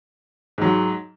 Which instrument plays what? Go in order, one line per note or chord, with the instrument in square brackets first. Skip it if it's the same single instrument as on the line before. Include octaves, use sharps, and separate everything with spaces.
[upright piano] G#2 F#3